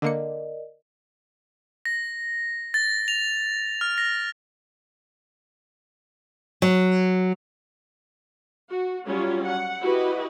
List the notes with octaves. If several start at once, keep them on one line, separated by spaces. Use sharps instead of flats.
D3 A#3 A#4 D5 D#5 C#7
A#6
A6
F7
F6
A#6
F#3
F#4
F#3 G3 C#4 F4
F#5
E4 F#4 G4 B4 D#5